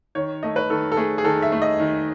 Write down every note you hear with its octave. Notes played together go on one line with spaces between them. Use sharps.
D#3 C#5
A3 D#5
B4
D#3 A4
A4
A3 G#4
G#4
D#3 A4
E5
A3
D#5
D#3